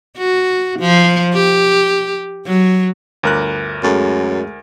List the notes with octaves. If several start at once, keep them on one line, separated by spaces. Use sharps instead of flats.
F#4
F3
G4
F#3
G1 D2 A#4 C#5 D6 F#6
F#2 G#3 A3 A4